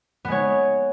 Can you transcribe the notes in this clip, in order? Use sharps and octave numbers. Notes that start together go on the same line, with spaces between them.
G#3 B3 C#5